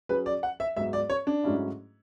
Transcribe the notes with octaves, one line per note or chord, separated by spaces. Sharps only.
F#3 C#4 G#4 B4
D5
F#5
E5
G#2 F#3 B3 E5
D5
C#5
D4
G#2 F#3 A3 C#4 E4